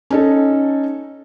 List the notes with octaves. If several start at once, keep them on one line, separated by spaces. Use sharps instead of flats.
C#4 D#4 A4